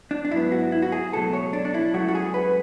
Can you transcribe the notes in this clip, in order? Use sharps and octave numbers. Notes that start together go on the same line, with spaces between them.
D4
D4
G#2 F#3 B3 E4
F#4
E4
F#4
G#4
C#2 B2 F#3 A3 A4
C#5
D4
D4
E4
C#2 C#3 F#3 A3 F#4
F#4
G#4
B4